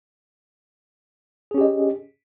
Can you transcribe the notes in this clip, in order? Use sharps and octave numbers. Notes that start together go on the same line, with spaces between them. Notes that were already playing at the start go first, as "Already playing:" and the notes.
C#4 G4 G#4 D#5